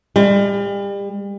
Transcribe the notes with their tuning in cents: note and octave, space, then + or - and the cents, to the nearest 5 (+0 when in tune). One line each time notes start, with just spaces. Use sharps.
G3 +35